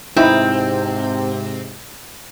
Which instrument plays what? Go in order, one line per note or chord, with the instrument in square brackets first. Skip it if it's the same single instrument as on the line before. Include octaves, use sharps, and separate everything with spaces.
[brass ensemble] G#2 C3 [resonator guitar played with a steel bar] C4 [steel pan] D#4 E4